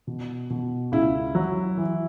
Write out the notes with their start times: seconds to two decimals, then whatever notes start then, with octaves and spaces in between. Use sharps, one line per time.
0.07 B2
0.50 B2
0.92 C#2 E4
1.35 F#3
1.77 E3